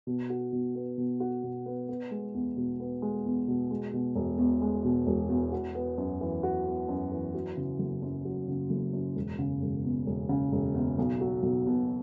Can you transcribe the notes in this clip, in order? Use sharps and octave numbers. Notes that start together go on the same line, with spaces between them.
B2
F#4
B2
B3
B2
F#4
B2
B3
B3
G#3
E2
B2
B3
G#3
E2
B2
G#3
B2
E1
E2
G#3
B2
E1
E2
F#4
B3
F#2
E3
F#4
B3
F#2
E3
F#3
C#3
F#1
F#2
F#3
C#3
F#1
F#2
E1
C#3
E1
E2
E1
C#3
E1
E2
B1
F#3
B1
B2